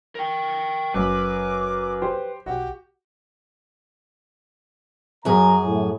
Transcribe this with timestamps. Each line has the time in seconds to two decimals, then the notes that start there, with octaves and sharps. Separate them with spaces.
0.15 A#4 G5
0.94 F#1 F#2 B4 D6
2.02 G4 C5
2.46 B1 F#4 G4
5.25 F#2 F#3 G#4 A#5
5.64 A2